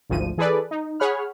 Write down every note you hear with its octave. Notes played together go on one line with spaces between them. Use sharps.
G#1 D2 F3 D#7
E3 G#4 A4 B4 D5
D#4
G#4 C#5 F#5 B5 F6